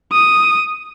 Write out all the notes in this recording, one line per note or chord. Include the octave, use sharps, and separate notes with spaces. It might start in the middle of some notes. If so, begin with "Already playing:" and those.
D#6